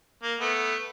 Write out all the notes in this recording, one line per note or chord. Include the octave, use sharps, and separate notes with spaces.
A#3
A3 B3